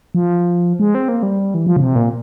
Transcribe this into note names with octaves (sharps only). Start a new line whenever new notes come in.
F3
G#3
C4
A#3
G3
E3
F3
C#3
C3
A#2